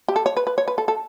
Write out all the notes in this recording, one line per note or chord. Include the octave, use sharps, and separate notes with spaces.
G4
A4
C#5
B4
B4
C#5
B4
A4
A4